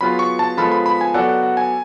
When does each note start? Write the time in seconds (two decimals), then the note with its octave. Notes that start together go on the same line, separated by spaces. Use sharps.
0.01 F#3 B3 F4 G#4 B5
0.19 C#6
0.39 A5
0.57 F3 G#3 B3 F4 A4 B5
0.72 B5
0.86 B5
1.01 G#5
1.14 F#3 B3 F#4 A4 D5 F#5
1.29 F#5
1.43 F#5
1.57 G#5